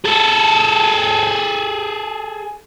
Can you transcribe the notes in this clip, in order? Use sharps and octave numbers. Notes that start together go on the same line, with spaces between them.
G#4 A4